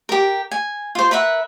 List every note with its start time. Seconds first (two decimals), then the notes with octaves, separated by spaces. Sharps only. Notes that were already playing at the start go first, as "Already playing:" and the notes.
0.09 G4 A#4
0.51 G#5
0.95 F4 C5
1.11 A#4 B4 E5 F#5